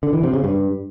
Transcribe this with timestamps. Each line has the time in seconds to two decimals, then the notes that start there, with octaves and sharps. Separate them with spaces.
0.03 D3
0.13 E3
0.23 C3
0.34 C#3
0.44 G2